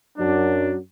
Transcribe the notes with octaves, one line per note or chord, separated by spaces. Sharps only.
F#2 F#3 D4